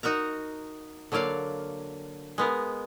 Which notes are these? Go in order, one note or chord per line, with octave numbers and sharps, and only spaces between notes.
D#4 F#4 A#4 A#5
D3 F#3 A#3 D5 F5
G#3 B3 A#4